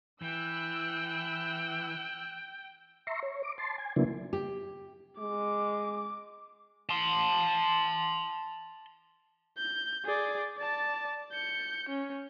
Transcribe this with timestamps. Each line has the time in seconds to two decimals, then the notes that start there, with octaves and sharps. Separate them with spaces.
0.22 E3 G5 E6 F#6
3.07 E5 A#5 C6 C#6
3.23 C#5
3.43 D6
3.58 A5 C6
3.78 G#5
3.96 C#3 F#3 A#3 B3 D4 E4
4.33 G4
5.19 G#3 D6
6.89 A5 C6
9.58 G6
10.05 G#4 D5
10.57 D5 A5
11.32 G6 C#7
11.89 C#4